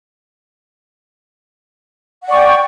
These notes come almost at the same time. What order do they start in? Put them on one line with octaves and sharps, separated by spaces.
F#5 D5 C#6 G5